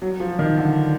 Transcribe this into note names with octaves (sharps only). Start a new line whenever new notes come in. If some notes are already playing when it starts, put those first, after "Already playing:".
F#3
F3
D#3
D3